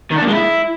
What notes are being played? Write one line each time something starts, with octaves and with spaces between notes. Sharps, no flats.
D#3
D4
A#3
G#3
E4